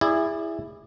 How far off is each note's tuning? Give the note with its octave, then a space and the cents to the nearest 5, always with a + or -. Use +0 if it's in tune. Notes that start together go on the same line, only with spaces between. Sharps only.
E4 +0 G#4 -25 D5 +5